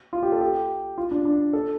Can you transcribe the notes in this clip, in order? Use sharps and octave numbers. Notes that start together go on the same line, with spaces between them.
F4
G4
A4
G4
F4
D4
D4
A4